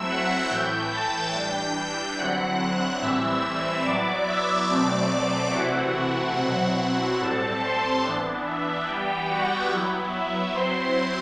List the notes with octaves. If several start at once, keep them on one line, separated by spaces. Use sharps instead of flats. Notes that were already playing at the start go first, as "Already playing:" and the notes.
Already playing: F#3 A3 C4 E4 E5 E6
F#5 F#6
A2 E3 A3 E4 G5 G6
A5 A6
E3 G3 D4 G5 G6
D3 F#3 C4 E4 F#5 F#6
A2 E3 G3 C4 E4 E5 E6
F#3 B3 E4 D5 D6
E5 E6
B2 F#3 A3 C4 D5 D6
C3 E3 A3 C4 E4 F#4 F#5
B2 F#3 C4 E4 F#4 F#5
A2 G3 C4 A4 A5
C5 C6
E3 B3 D4
E5
E3 G3 B3 G4 G5
F#4 F#5
F#3 B3 E4
E5
F#3 C4 E4 C5 C6